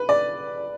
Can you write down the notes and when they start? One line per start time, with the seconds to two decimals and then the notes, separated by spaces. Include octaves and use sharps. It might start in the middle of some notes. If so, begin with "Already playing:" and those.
Already playing: B4
0.09 D5